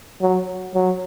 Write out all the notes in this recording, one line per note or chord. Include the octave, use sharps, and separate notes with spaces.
F#3
F#3